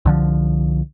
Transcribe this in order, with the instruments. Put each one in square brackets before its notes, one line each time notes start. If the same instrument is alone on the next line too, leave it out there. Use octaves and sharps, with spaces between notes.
[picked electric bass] C2 D3 F3